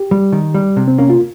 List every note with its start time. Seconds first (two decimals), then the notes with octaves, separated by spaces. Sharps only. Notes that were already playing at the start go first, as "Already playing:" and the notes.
Already playing: G4
0.11 G3
0.32 D#3
0.54 G3
0.77 C3
0.88 C4
0.98 A#3 C#4
1.10 F4